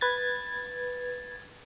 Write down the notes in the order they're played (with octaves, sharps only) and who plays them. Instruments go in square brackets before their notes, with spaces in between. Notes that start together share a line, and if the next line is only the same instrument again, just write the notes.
[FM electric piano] B4 G#6 A6